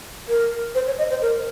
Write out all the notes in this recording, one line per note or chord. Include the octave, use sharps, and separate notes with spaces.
A#4
C5
C#5
D#5
C5
A#4